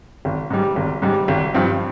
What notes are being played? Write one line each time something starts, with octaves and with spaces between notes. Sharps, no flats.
G#1
G#2 G3
G#1
G#2 G3
G#1
G2 F3 C4